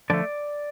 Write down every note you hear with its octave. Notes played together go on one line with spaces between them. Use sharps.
D3 F3 A3 D5